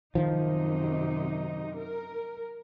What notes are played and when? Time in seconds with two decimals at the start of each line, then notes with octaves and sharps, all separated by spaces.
0.15 F#2 C3 D#3 F3 D#4
1.76 A#4